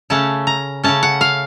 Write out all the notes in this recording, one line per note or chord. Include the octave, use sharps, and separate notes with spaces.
C#3 A3 C#4 A5
A#5
C#3 A3 C#4 A5
F#5
F5